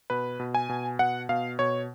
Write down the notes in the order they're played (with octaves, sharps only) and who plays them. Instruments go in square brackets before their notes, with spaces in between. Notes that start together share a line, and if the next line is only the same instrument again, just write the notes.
[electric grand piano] B2 B4
B2
G#5
B2
B2 F#5
B2 F5
B2 C#5